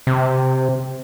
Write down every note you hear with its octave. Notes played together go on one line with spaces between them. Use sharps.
C3